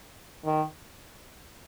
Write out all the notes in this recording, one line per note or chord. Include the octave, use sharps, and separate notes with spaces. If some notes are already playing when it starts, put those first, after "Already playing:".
D#3